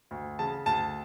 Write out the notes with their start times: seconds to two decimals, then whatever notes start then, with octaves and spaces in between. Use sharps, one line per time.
0.11 D2
0.39 C#3 A5
0.66 D2 A5